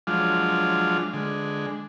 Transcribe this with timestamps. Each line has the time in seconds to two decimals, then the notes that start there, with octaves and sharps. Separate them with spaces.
0.07 F3 F#3 G#3 D4 F4
1.13 D3 G#3